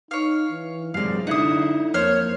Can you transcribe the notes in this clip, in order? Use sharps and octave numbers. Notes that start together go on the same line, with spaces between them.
D#4 C#5 F5
E3
F#2 C3 G#3 D5 F5
D3 D#4 E4 F#5 D#6
F2 A#3 C5 C#5 F6